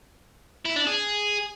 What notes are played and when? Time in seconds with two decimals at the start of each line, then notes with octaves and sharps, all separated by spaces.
0.66 E4
0.76 D4
0.87 G#4